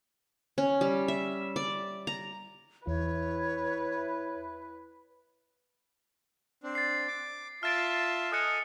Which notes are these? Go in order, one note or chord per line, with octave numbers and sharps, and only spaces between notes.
C#4
G3
E5
D5
A#5
E2 E4 B4 C#5
C4 D4
A6 C7
D6
F4 E5 A5 F6 A6 D7
A4 D#5 G#5 D#6 F#6 C#7